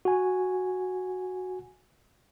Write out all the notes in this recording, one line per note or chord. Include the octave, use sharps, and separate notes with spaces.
F#4 G#5